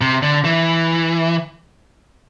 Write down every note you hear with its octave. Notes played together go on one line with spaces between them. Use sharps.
C3
D3
E3